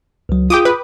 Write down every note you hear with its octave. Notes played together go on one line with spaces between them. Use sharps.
C#2 F#3
F4 G#4 G5 D6 D#6
B4